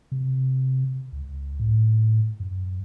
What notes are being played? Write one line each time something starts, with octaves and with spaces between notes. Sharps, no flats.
C3
C#2
A2
F#2